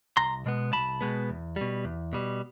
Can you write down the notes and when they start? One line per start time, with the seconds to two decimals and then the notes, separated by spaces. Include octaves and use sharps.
0.17 C2 A#5 C6
0.46 B2 G#3 B3
0.73 C2 A5 B5
1.01 B2 G#3 B3
1.30 E2
1.56 B2 G3
1.85 E2
2.13 B2 G3